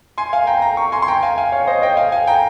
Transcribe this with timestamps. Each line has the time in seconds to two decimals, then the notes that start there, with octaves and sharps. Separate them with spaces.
0.18 G#5 C6
0.33 F5 G#5
0.47 G5 A#5
0.62 G5 A#5
0.77 A#5 C#6
0.92 G#5 C6
1.02 C6
1.08 G5 A#5
1.23 F5 G#5
1.38 F5 G#5
1.52 C#5 F5
1.67 C5 D#5
1.82 D#5 G5
1.97 F5 G#5
2.12 F5 G#5
2.27 G5 A#5